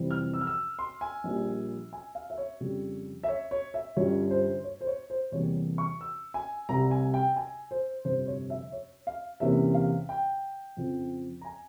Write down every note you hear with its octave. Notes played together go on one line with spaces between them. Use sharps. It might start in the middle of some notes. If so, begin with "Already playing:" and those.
Already playing: F2 C3 E3 G3 C4
F6
E6
F6
E6
C6
G#5
A#1 A#2 G3
G#5
F5
E5
C#5
F2 C#3 G3
E5
C#5
C#5
E5
G1 G2 G3 C#4 F4 C#5
C5
C#5
C5
C#5
C5
E2 C3 G3 A#3 C#5
C#6
E6
G#5
C2 C3 G3 A#5
G#5
G5
G#5
C5
G1 F2 C3 C5
C#5
E5
C#5
F5
E2 C3 E3 A#3 C#4 E5
F5
G5
F2 C#3 F3 C4 F4
A#5
G#5